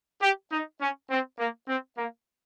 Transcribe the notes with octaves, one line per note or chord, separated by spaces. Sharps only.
G4
D#4
C#4
C4
A#3
C4
A#3